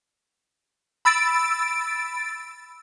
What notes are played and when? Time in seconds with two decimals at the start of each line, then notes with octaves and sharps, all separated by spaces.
1.05 B5 E6 A6 D7